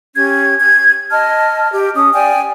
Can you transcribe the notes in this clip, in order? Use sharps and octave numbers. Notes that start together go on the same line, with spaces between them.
C#4 G4 G#6
G#6
D#5 A5 F6
G4
C#4 D#6
D5 G5 G#5